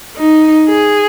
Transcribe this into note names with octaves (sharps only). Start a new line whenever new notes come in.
D#4
G#4